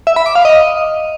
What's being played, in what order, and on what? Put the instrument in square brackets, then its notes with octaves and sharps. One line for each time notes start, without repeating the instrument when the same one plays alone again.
[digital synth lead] E5
B5
D6
F5
D#5